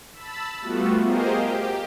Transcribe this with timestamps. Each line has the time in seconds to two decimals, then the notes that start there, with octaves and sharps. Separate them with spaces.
0.12 A5 B5 E6
0.61 G3 A3 B3 F4 F#4
1.02 G4 G#4 A#4 C5 D#5 F5
1.35 G4